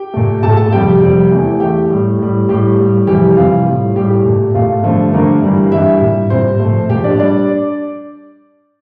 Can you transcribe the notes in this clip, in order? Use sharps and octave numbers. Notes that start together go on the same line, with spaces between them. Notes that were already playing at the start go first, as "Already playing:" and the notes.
Already playing: G4 G5
A#2 A3
A#2 A3 A4 A5
A4 A5
F2 C3 G3 G4 G5
F2 C3 G3
E2 E3 A3
E2 E3 A3 G4 G5
A2 G3
A2 G3
A2 G3 G4
A2 G3
F2 C3 E3 G3 G4
F2 C3 E3 G3 F4
A2 G3
A2 G3 G4
G4
A#2 A3
A#2 A3 F4
G2 D3 F3 A3
G2 D3 F3 A3 A#3 A#4
G2 E3 G3
G2 E3 G3 E4 E5
A#2 G3
A#2 G3 C4 C5
A#2 F3 A3
A#2 F3 A3 G4
D4 D5
G3 D4 D5